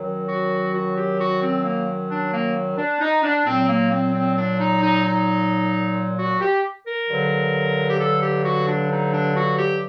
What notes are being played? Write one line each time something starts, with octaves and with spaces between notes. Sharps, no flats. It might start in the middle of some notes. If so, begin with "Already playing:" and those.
Already playing: F#2 D#3 F#3
F#4
F#4
G4
F#4
C4
A#3
D4
A#3
D4
D#4
D4
A#2 F#3 C4
A#3
C4
C4
D4
D#4
D#4
D#4
F#4
G4
A#4
G2 D3 F#3
G4
A4
G4
F#4
D4
D#4
D4
F#4
G4